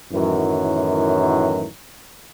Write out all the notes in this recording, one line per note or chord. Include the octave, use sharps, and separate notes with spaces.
F#2 A2 D#3 E3 F#3